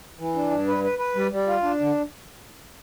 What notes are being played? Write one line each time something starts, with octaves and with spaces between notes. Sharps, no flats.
E3
D4
G2
B4
B4
B4
G3
G3
F4
D4
D3